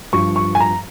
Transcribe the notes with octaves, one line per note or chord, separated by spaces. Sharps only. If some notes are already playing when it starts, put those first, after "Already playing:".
G2 F3 C#6
C#6
G#5
A#5